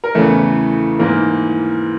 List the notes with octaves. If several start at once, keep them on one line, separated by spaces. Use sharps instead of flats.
A#4
E2 C#3 E3 A3 A4
G#2 E3 A#3 A#4